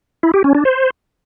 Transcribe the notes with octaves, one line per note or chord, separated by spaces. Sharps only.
E4
G4
C#4
D4
C5